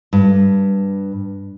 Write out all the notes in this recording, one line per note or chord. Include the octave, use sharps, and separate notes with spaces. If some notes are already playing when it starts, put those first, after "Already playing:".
G2